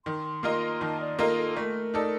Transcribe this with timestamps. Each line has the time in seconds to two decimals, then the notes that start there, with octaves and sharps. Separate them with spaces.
0.05 D#3 C6
0.43 A#3 F4 A#4 D#5
0.81 D#3 A5
1.00 D5
1.19 A#3 F4 A4 A#4 D#5
1.38 A4
1.56 A3 A#4
1.94 D#4 A4 D5